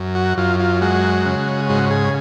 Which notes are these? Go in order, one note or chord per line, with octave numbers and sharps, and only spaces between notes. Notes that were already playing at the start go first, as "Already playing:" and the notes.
Already playing: F#2
F#4
F#2 F4
F4
G#3 F#4
C#3
G#2 F#4
G#4